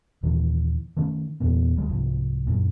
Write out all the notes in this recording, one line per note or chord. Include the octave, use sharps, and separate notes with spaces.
D#2 A#2 D#3 E3
D#3 A3 C#4
E2 A#2 B3
D2 G3 G#3
C2 G#2 F3
F#2 A#2